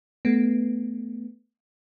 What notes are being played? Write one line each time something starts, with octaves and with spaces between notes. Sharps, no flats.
A3 B3